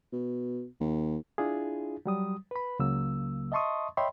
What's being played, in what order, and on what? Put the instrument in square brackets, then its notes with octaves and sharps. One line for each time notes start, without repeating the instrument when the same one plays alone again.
[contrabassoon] B2
D#2
[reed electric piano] D4 E4 F4 G#4
F#3 G3 D#6
B4 B5
C#2 C#3 F#3 A#3 E6
D#5 E5 A5 C6 C#6 D#6
C#5 D#5 E5 G5 B5 C6